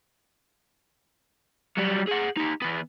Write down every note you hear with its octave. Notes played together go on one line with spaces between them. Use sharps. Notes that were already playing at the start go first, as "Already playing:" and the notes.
F#3 G3
G#4 F#5
D#4 G4
E3 B3